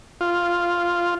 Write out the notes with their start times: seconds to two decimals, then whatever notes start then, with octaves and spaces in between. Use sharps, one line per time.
0.21 F4